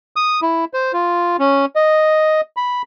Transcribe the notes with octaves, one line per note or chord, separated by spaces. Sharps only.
D#6
E4
C5
F4
C#4
D#5
B5